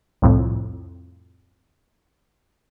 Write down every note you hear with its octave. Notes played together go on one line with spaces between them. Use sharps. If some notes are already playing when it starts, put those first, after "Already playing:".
C2 F2 A2